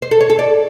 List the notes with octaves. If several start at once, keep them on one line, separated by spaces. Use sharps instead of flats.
C5
A4
C#5
A4
D5